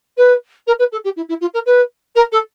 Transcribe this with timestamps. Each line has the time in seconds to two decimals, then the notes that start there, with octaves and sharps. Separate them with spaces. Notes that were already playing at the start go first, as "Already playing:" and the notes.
0.17 B4
0.67 A#4
0.79 B4
0.91 A4
1.04 G4
1.16 E4
1.28 E4
1.40 F4
1.53 A#4
1.65 B4
2.15 A#4
2.32 A4